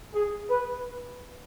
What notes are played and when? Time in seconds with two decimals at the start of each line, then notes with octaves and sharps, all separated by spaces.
0.13 G#4
0.49 B4